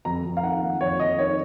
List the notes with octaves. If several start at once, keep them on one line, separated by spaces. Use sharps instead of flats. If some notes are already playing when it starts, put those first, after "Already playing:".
F2 A#5
F2
F5
D#3 F#5
A#3
F2 C#5
F2 D#5
D#3 C#5